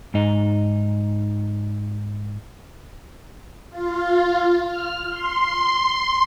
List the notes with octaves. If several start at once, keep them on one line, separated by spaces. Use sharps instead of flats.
G#2 D#4
F4
F6
C6